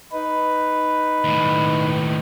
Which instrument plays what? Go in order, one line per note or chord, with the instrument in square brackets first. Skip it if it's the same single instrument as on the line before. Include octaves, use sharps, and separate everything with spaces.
[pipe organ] D#4 B4
[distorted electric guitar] D#2 A2